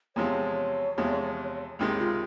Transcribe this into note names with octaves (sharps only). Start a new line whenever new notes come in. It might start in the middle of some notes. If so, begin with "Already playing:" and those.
E2 C3 F3 G#3 C#5
E2 C3 F3 G#3
C#2 C3 D#3 G#3
F4